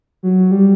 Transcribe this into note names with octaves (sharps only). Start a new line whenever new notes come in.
F#3
G3